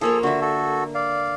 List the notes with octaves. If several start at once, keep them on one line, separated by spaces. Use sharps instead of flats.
F3 A#3 G#4 A4 C#5
D3 F#4 E5
F#4 A4
D5 F5